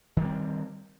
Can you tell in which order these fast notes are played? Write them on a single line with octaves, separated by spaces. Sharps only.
D#3 G3 C4